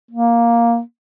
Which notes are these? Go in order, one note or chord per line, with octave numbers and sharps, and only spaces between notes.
A#3